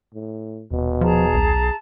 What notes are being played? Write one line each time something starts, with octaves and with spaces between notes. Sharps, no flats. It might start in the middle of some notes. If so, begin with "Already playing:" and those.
A2
D#1 B2
F3 G#4 A5 A#5
B1